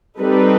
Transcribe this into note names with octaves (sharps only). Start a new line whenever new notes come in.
G3 C4 D#4 A4 B4